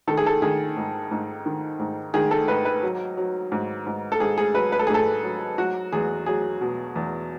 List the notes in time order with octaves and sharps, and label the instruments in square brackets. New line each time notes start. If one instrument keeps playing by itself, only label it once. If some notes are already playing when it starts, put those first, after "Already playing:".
[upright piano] D#3 A4
G#4
A4
D#3 G#4
G#2
G#2
D#3
G#2
D#3 G#4
A4
G#2 B4
B4
F#3
F#3
G#2
G#2
A4
G#2 G#4
G#4
F#3 B4
B4
A4
G#4
G#2 A4
F#3
F#3 F#4
E2 G#4
F#3 G#4
B2
E2